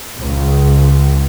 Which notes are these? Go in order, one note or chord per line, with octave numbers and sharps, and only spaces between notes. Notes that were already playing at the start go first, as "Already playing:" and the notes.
C#2